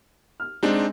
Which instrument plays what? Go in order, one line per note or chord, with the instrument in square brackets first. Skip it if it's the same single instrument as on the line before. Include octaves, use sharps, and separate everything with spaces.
[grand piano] F6
[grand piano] G#3 [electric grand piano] C4 D4 D#4